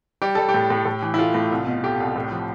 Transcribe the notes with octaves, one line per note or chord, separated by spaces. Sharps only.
G3 G4
G3 A4
G4
A2
A2
A2
E3
E4
A3 F4
A2
C2
B2
A3 G4
C2
A2
F3